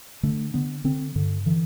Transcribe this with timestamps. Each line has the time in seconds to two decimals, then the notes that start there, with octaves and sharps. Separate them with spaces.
0.23 D3 A3
0.54 D3 B3
0.84 D3 C4
1.15 G2 D3
1.46 D3 E3